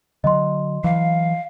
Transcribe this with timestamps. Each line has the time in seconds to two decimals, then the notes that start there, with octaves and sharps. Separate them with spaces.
0.24 D3 F#3 D#5 C6
0.84 E3 F#3 F5